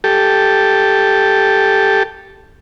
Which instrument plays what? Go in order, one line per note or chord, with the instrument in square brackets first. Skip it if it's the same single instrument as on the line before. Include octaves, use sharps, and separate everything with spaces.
[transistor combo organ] G4 A4